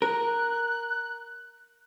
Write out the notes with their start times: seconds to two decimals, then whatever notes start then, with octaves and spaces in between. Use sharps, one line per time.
0.02 A#4 F#6